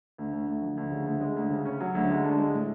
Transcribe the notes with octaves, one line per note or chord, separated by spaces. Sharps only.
D2
D2
D2
F3
D2
C#3
D2
G#3
D2
C#3
C#4
F#3
D2
G#3
D3
G#3
A2